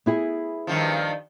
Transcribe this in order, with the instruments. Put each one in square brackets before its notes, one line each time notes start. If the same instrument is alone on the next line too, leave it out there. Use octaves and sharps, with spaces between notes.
[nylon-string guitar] B3 E4 G#4
[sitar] G2 D#3 F3